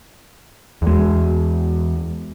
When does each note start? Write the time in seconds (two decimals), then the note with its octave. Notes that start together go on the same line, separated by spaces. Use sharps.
0.82 E2 G#3